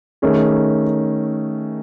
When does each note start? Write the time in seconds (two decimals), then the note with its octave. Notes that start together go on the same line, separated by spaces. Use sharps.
0.22 D#3 A3 C#4 G#4